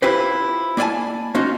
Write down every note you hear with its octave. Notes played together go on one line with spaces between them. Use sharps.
E4 F4 G4 B4 C5
A#3 E4 D5 E5 G#5 A5
A#3 C#4 D#4 F4 F#4